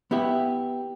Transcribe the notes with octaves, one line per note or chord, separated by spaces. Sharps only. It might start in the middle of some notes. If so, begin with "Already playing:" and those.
B3 E4 G4 E5